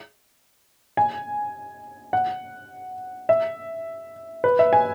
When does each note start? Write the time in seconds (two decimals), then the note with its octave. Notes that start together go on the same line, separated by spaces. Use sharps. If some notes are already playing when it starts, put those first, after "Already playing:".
0.97 G#5
2.13 F#5
3.29 E5
4.44 B4
4.59 E5
4.73 G#5